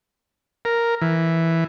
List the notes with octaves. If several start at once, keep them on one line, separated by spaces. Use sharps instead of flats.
A#4
E3